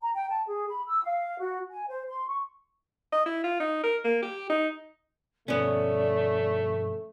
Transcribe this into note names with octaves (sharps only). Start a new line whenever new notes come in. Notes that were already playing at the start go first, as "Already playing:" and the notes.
A#5
G5
A5
G#4
B5
E6
F5
F#4
G#5
C5
C6
C#6
D#5
E4
F4
D#4
A#4
A#3
G4
D#4
G2 B2 F3 A3 B3 C#4 D5